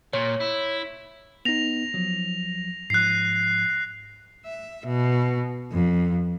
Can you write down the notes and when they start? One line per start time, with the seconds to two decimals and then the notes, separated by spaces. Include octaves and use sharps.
0.13 A#2 C#5
0.40 E4
1.45 B3 D#4 A#6 F7
1.94 F3 F#3
2.90 G#2 F3 F#6 C7
4.45 E5
4.86 B2
5.72 F2